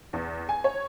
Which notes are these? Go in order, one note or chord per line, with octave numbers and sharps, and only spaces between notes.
E2
G#5
C#5